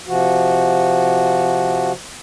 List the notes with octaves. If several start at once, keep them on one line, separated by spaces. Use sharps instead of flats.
C3 F3 F#4